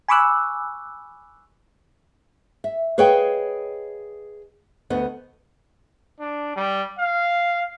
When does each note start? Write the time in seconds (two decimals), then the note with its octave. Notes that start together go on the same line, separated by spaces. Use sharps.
0.08 G#5 B5 C#6 D6 E6 F#6
2.64 E5
2.98 G#4 B4 C#5 D#5 F5 G5
4.90 D2 B3 D#5
6.20 D4
6.56 G3
6.98 F5